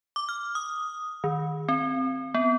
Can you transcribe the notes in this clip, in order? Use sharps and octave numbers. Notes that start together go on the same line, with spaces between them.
D6
F6
D#6
D#3
C4
B3